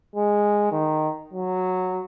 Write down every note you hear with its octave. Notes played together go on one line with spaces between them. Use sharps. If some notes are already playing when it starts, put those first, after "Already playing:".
G#3
D#3
F#3